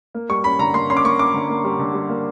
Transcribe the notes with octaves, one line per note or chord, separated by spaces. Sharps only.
A#3
G3 C#6
C#4 B5
D3 A#5
A#3 C6
C#4 C6
D6
A#3 C#6
C#4 D6
D3
A#3
G3
D3
G3
A#3